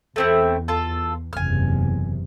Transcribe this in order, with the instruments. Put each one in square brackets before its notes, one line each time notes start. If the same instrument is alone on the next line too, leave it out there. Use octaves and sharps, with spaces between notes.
[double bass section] E2 [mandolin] A3 C4 E4
[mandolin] F4 A4
[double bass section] F#1 E2 C3 [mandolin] G#5 F6